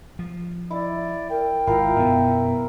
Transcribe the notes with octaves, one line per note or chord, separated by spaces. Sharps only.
F3
E4 D5
A#4 G5
G#1 E4 F4 A#4 F5
F#2 B2 B3 E5